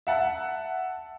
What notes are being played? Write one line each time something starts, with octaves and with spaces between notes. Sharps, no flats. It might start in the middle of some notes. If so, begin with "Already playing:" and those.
E5 F#5 A5